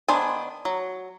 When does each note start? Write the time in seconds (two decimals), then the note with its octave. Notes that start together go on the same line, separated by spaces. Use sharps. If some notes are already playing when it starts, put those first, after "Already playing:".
0.08 D#3 B3 D4 C5 G#5
0.65 F#3